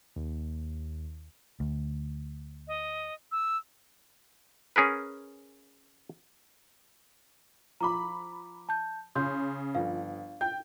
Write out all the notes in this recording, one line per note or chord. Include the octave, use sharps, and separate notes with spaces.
D#2
D2
D#5
E6
C#4 G#4 A#4 B4
F3 A#5 B5 D6
A5 G6
C#3 C6 G6
G1 F3 F5
G5 G6